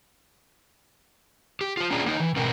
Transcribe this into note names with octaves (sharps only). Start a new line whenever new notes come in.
G4
F4 C5
C#4 D4 F4 G#4 D5 A#5
A#3 D#4
E3
G#2 B2 C4 A#4